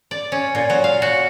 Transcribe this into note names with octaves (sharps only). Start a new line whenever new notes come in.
D5
C#4
A#2
F#3
F5
F#4